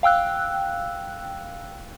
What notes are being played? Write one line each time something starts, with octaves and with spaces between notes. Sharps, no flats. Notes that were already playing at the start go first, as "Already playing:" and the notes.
F5 G5 E6 F#6